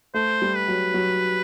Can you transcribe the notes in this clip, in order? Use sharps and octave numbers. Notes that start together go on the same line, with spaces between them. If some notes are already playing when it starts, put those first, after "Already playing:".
A3 C5
G3
B4
F#3
F#3